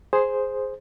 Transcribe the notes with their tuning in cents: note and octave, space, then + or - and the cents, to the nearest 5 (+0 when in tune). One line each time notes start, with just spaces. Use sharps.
G#4 +0 C5 +0